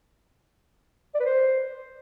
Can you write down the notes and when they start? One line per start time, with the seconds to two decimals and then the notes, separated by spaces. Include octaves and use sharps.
1.15 D5
1.20 B4
1.25 C5